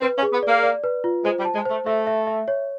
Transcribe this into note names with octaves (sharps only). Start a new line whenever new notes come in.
C4 B4
C#4
G#4
B3
A#3 D5
D5
B4
F4
G#3 C5
G3
A5
G#3
C5
A3
A3 E5
E5
E5
C#5